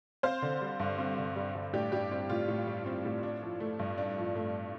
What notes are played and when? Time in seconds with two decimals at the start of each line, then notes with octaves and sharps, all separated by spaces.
0.23 C4 C5 F5
0.42 D3
0.61 G3
0.80 G2
0.99 C4
1.18 D3
1.36 G3
1.55 G2
1.73 A2 D4 G4
1.92 G3 D4 G4
2.11 C4 D4
2.29 A2 F4
2.48 A2
2.67 G3
2.86 C4
3.05 A2
3.23 D4
3.42 F3
3.60 A3
3.79 G2
3.98 D4
4.17 F3
4.35 A3